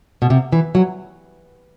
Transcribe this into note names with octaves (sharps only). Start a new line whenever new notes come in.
B2
C3
E3
F#3